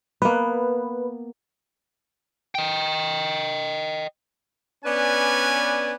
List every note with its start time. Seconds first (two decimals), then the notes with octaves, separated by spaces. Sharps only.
0.22 A#3 B3 B4
2.55 D#5 G5
4.85 B3 C#4 D4 B4 D5 G#5